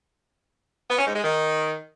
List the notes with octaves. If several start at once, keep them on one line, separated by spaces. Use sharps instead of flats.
B3
C#4
G#2
G#3
D#3